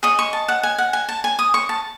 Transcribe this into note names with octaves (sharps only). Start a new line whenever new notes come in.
G#4 D#5 C#6
C#6
A5
F#5
G#5
F#5
G#5
A5
G#5
D#6
C#6
A5